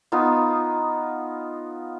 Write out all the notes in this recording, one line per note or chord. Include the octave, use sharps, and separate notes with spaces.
B3 D#4 F4